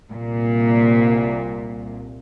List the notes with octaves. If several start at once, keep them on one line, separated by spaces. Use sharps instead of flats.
C2 A#2